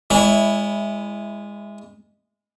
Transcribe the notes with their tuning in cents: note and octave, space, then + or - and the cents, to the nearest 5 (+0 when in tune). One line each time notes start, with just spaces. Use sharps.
G#3 -15 E4 +0 C#5 +40